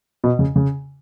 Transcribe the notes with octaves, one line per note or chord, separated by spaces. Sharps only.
B2
C#3
C#3